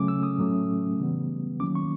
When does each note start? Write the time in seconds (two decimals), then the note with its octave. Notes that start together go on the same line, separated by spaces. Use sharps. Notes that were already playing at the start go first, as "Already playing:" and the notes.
Already playing: C#3 F#3 A3 C#4 D6
0.08 E6
0.23 D#6
0.38 A2 F#3 A3 C#4
0.99 C#3 E3 G3 B3
1.60 D#3 F#3 A#3 C#4 D6
1.75 C#6